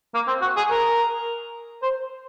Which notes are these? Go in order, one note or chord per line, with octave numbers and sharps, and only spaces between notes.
A#3
C4
F#4
G#4
A#4
C5